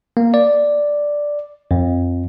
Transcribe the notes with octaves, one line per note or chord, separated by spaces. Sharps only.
A#3
D5
F2